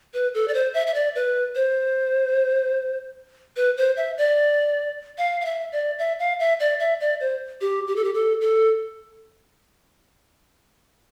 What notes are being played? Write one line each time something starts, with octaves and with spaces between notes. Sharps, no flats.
B4
A4
D5
C5
E5
E5
D5
B4
C5
B4
C5
E5
D5
F5
F5
E5
D5
E5
F5
E5
D5
E5
D5
C5
G4
G4
A4
G4
A4
A4